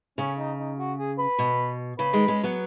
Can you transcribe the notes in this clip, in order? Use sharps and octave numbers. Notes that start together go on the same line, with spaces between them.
C#3 C#4
D#4
D#4
F#4
G#4
B4
B2
C#3 B4
D#3 G#3
G#3 C#4
F#3 B3